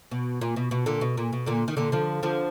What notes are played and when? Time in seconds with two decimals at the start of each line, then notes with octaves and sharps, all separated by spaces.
0.11 B2
0.41 A#2
0.56 B2
0.71 B2
0.86 A#2 D3
1.01 B2
1.18 A#2
1.33 B2
1.46 A#2 D3
1.68 D#3
1.77 A#2 D3
1.92 D3 F3
2.23 D3 F3